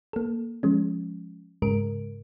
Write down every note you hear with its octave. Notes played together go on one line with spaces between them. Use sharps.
A#3 A4
F3 G#3 C#4
G#2 C#3 G#3 A#4 D7